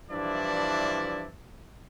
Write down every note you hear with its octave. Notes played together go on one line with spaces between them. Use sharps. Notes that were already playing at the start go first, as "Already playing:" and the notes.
G2 E3 F3 D4 E4 D5